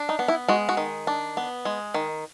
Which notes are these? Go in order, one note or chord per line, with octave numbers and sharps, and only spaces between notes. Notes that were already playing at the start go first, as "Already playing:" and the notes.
Already playing: D4
D#4
B3
E4
G#3 F#4
F#4
D#3
D4
B3
G#3
D#3